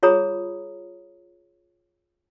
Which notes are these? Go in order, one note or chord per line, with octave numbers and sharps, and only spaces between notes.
F4 G#4 C#5 A#5 B5 D#6